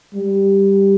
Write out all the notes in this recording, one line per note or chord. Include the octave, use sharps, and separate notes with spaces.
G3